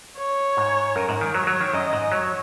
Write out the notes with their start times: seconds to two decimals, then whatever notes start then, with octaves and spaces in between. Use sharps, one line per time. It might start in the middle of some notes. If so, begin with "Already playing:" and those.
0.18 C#5
0.57 G#2
0.96 F#2 A#4
1.09 G#2
1.21 D#3
1.34 F#3 C#5
1.47 F#3
1.61 D#3
1.73 F#2 D#5
1.93 G#2
2.12 F#3 C#5